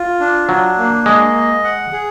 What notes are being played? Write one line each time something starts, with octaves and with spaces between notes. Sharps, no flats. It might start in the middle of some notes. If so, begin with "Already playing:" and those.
Already playing: F4
D4
F#3 D4
A#3
G#3 D#5
D#5
F#5
G#4